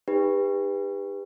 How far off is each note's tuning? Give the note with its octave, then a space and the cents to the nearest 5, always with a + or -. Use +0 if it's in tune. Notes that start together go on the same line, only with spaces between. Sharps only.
D#4 +0 G4 +35 B4 +0